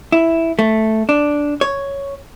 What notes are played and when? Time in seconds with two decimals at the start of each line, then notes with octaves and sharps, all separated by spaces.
0.12 E4
0.59 A3
1.09 D4
1.61 C#5